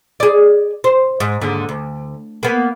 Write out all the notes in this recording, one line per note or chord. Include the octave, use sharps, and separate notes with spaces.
G#4 D5
C5
G#2
D#2 G#2 D3
D2
A#3 B3